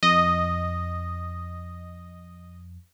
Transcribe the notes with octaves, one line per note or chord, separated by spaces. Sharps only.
F2 D#5